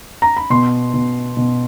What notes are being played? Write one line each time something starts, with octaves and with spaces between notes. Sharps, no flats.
A#5
B5
B2 C6
B2
B2